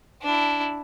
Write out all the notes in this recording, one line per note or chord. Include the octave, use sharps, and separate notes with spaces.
D4 E4